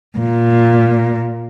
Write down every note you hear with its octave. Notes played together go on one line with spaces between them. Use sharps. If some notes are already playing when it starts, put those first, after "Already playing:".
A#2